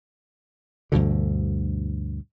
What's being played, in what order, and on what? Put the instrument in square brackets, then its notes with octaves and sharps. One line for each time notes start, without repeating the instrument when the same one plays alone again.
[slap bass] D2 G2 B2 D3